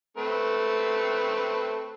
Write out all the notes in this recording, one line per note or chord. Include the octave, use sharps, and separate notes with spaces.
A3 C4 B4